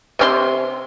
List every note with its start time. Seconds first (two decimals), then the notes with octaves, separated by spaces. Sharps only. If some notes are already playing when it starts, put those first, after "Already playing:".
0.19 C3 C#4 C6